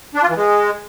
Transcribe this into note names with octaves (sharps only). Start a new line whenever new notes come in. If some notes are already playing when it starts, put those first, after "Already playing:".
D4
F4
E3
G#3